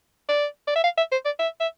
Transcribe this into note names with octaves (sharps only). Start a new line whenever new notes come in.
D5
D5
E5
F5
E5
C5
D5
E5
E5